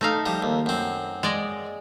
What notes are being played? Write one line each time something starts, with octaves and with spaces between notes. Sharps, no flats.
A3 D#4 F5
F3 G3
D#2
F#2 C4
G#3 D5 D#5